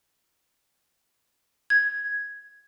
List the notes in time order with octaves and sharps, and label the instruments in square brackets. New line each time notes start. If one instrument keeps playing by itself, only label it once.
[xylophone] G#6